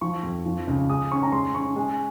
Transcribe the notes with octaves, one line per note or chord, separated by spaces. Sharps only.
F3 C#6
F2
F3
C#2
G#3 D#6
C#4 C#6
A#5
G#3 C6
C#4 C#6
G#3